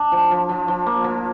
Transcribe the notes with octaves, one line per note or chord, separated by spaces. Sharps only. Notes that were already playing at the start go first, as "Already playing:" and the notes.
Already playing: D4
F3
F3
F3
F3
A#3
F3